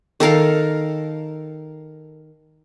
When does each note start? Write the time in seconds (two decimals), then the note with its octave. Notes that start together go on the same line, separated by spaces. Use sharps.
0.20 D#3 A4 A#4 F5